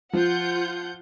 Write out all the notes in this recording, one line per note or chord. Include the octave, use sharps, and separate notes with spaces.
F3 F4 F#5 G6